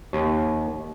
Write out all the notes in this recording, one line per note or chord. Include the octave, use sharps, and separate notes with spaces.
D#2